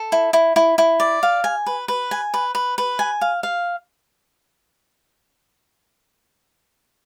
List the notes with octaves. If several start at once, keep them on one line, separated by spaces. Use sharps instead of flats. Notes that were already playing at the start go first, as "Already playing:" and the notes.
Already playing: A4
E4
E4
E4
E4
D5
F5
G#5
B4
B4
G#5
B4
B4
B4
G#5
F5
F5